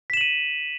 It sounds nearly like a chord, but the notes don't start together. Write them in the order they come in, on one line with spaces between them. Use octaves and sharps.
B6 E7 F#7 D#7